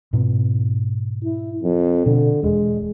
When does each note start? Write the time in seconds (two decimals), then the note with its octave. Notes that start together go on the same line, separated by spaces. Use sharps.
0.13 G#2 B2 C4
1.24 E4
1.63 F2
2.06 B2 D3
2.43 E1 G#3